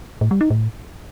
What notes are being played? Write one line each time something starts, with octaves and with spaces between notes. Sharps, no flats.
A2
G3
D#4
A2